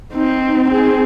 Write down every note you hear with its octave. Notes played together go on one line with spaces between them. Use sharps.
C4 D#4
C4 G#4